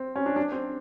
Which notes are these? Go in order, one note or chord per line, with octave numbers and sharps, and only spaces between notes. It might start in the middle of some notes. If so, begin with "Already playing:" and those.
Already playing: C4
C#4
D4
D4
C4